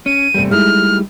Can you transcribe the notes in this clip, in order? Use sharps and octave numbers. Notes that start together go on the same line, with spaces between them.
C#4 D#7
E2 A2 C3 G3 A3
G#3 D#4 E4 F6